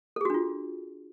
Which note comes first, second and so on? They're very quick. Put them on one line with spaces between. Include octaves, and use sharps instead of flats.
A4 G#4 F#4 D4 F4